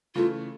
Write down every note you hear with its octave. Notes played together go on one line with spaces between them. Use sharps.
C#3 E3 A3 F4